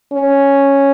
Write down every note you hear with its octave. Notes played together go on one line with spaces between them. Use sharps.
C#4